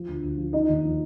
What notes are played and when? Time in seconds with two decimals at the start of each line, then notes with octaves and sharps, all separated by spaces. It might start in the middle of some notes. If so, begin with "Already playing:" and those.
Already playing: F3
0.08 D2
0.23 D2
0.38 F3
0.53 F3 D#4 D#5
0.69 D#2
0.83 F3